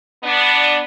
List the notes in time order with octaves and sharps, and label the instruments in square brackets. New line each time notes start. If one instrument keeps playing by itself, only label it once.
[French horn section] B3 D4